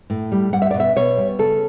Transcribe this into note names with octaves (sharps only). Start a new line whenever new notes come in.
A2
G3
G3 F#5
E5
B2 D5
E5
B2 C#5
G3
C#3 A4